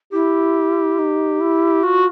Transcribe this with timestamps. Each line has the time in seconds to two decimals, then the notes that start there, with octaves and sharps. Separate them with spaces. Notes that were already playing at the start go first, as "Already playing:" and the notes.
0.13 E4 G4
0.99 D#4
1.41 E4
1.84 F4 F#4